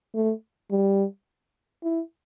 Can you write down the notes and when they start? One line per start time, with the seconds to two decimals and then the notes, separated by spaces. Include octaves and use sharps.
0.14 A3
0.71 G3
1.84 E4